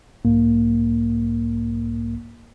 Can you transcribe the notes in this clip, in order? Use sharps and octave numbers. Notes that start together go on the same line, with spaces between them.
B1 G#2 A#3